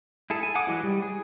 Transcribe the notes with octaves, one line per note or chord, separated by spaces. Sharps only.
E4 G#4 A4
G#5
F#5 G#5 D6 D#6
E3 F#3 G#3 E4
G3
G#4